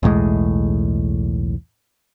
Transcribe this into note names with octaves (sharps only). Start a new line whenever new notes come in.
B1 E2 A2 G#3